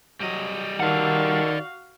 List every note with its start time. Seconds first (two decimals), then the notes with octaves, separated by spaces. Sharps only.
0.20 F#3 G3 D#5
0.80 D#3 F#4 D5 F5 F#5